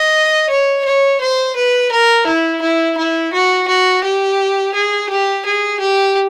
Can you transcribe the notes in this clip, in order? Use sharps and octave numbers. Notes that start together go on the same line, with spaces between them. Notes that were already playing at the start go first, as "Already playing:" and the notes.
Already playing: D#5
C#5
C#5
C5
B4
A#4
E4
E4
E4
F#4
F#4
G4
G#4
G4
G#4
G4